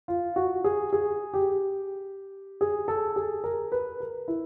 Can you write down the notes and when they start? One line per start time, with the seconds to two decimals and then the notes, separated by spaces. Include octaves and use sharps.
0.08 F4
0.36 F#4
0.64 G#4
0.93 G#4
1.33 G4
2.61 G#4
2.88 A4
3.16 G#4
3.44 A#4
3.72 B4
4.00 A#4
4.28 E4